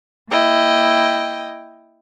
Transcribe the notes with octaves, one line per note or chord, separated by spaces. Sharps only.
A#3 E4 D#5 G5